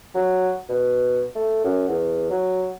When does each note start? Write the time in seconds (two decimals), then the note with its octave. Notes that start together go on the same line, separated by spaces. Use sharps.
0.15 F#3
0.69 B2
1.35 A3
1.64 F#2
1.88 E2
2.30 F#3